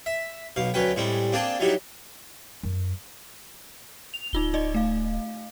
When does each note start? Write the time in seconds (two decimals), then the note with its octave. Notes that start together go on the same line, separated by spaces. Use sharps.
0.06 E5
0.56 B1 B2 F5
0.74 D2 F#3 C#4 B4 G5
0.96 A2 G3 G#3 C4
1.32 A#3 C4 D4 G#4 G5 A5
1.59 F#3 G3 D#4 E4 F#4
2.63 F#2
4.14 F7
4.33 D1 D#4 F4 G7
4.54 D#4 D5 D#5
4.74 A3 F5